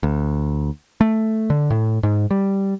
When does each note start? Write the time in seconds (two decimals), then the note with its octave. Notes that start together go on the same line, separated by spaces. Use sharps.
0.03 D2
1.01 A3
1.50 D3
1.70 A2
2.03 G#2
2.31 G3